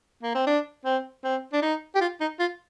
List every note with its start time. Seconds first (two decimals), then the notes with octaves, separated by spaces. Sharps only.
0.23 A#3
0.35 C4
0.47 D4
0.85 C4
1.24 C4
1.53 D4
1.62 D#4
1.96 G4
2.01 F4
2.21 D#4
2.40 F4